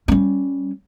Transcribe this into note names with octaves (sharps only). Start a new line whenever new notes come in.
G3 C#4